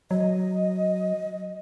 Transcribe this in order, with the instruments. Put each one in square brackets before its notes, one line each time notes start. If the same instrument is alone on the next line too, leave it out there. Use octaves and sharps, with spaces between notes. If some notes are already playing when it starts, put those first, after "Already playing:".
[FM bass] F#3 [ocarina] D#5